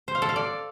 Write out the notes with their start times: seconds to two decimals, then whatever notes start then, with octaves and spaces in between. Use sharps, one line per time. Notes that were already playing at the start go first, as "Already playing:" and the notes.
0.08 C5
0.15 F5
0.22 A4
0.29 F5
0.36 D5